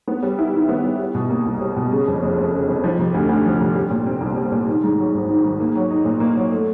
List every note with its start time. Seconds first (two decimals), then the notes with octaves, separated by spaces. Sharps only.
0.08 B3
0.23 G3
0.39 E4
0.54 D#3
0.69 B3
0.84 G3
0.99 G3
1.15 B2
1.30 A#3
1.46 C2
1.61 G3
1.77 B2
1.92 C#3
2.07 F2
2.23 F1
2.38 F1
2.53 C#3
2.68 F2
2.84 F3
2.99 C3
3.14 D2
3.29 D2
3.45 F3
3.61 C3
3.75 G3
3.90 A#2
4.06 C4
4.21 C2
4.37 G3
4.52 A#2
4.68 D#3
4.83 G#2
4.98 F#3
5.14 G#1
5.29 D#3
5.44 G#2
5.60 A#3
5.75 F#3
5.91 D#4
6.05 A#2
6.20 A#3
6.36 F#3
6.52 A3